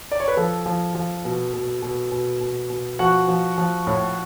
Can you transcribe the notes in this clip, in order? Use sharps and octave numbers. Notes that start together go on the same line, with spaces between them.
D5
C#5
B4
F3 A4
F3
F3
B2
B2
B2
B2
B2
B2
F3 F#4 F#5
F3
F3
A2